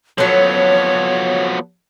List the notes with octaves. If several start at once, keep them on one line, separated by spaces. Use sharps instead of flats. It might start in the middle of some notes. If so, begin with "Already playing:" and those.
F3 F#3 B3 A4 C#5